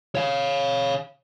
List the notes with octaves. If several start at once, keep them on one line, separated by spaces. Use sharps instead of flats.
C#5 F5